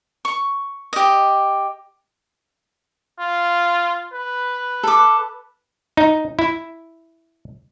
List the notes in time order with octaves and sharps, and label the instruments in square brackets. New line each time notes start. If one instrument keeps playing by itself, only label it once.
[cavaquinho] C#6
G4 D#5
[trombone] F4
B4
[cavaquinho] A4 D6
[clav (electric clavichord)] D#4
E4